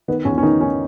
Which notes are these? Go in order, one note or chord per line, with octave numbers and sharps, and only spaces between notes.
D#3 B3
E2 C#4
C#4
D#3 D#4
D#3 C#4